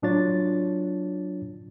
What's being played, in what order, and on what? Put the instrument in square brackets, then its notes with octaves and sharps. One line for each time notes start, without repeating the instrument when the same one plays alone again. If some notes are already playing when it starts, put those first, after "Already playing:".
[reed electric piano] A2 F#3 D4 F4 C#5 A6